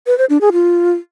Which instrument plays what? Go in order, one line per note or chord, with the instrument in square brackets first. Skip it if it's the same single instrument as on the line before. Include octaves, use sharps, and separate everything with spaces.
[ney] B4
C5
D4
G#4
F4